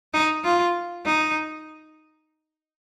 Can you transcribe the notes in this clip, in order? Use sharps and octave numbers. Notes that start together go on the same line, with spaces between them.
D#4
F4
D#4